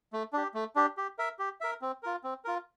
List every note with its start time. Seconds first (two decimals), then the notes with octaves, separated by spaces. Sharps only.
0.13 A3
0.33 D4 G4
0.54 A3
0.76 D4 G4
0.97 G4
1.19 A#4 E5
1.39 G4
1.61 A#4 E5
1.82 C4
2.03 F4 A#4
2.24 C4
2.45 F4 A#4